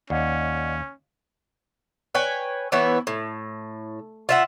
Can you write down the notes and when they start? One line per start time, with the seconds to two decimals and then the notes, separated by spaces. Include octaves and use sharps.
0.10 D#2 C#4 D5 D#5 F#5
2.15 B4 C#5 G5 G#5
2.72 E3 B3 E4 C#5
3.07 A2
4.29 F4 E5 F#5